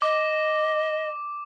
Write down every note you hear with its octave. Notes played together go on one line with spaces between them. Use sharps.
D#5 D6